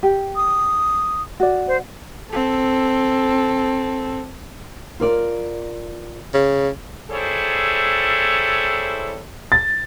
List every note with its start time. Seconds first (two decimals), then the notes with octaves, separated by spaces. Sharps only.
0.03 G4
0.36 D#6
1.40 F#4 D5
1.68 C5
2.31 C4 A4
5.00 F4 A#4 D5
6.34 C#3
7.11 G3 E4 G#4 A4 C5 C#5
9.52 A6